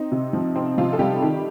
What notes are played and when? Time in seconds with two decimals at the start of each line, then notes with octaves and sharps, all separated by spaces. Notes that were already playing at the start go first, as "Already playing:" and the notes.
Already playing: C4 D#4
0.12 C3
0.33 F3
0.55 C4 D#4
0.78 C3 F3 F4
0.93 A4
0.99 C3 G3 G4
1.22 D#3